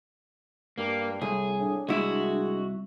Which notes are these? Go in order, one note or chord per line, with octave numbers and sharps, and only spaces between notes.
G2 A#3
C2 A2 G#4
A2 D4
C2 G#3 E4 F#4